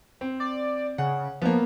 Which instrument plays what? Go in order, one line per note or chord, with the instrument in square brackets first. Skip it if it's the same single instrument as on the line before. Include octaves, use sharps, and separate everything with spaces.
[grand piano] C4
[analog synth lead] D5
[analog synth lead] C#3 [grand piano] F#5
[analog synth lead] F3 [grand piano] A#3 B3